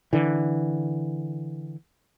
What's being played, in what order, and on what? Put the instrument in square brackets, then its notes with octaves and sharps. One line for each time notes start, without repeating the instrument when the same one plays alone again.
[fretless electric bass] D3 E3